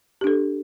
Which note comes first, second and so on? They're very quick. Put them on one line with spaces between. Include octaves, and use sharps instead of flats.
G4 D4 A4